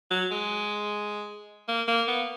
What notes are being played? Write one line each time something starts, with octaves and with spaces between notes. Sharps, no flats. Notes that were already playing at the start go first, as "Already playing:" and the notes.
F#3
G#3
A#3
A#3
B3